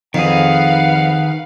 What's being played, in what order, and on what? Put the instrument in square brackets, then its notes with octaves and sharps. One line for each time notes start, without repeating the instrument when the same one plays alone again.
[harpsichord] F2 [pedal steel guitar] D#3 G#4 [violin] B4 F5 [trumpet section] F#5